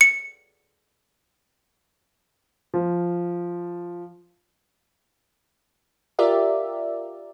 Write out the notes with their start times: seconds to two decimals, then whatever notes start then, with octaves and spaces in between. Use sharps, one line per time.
0.01 C#7
2.74 F3
6.19 F4 G4 A#4 D5 E5